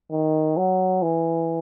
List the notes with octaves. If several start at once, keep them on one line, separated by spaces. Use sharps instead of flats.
D#3
F#3
E3